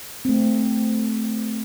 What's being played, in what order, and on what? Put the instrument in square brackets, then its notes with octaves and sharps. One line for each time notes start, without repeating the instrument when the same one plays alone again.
[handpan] A3 C4